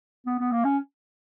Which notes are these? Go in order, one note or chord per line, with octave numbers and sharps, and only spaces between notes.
B3
B3
A#3
C#4